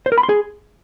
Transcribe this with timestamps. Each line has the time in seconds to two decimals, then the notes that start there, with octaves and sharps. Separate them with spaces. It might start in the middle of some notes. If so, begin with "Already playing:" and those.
0.06 C5
0.12 A#4
0.18 B5
0.23 C6
0.29 G#4